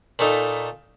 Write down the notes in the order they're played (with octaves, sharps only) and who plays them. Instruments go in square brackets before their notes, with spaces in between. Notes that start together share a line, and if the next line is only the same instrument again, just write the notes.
[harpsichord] A#2 A3 D#4